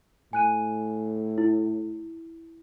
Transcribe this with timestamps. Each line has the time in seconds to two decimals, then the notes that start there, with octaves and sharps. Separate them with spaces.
0.33 A2 G#5 F#6 D#7
1.38 E4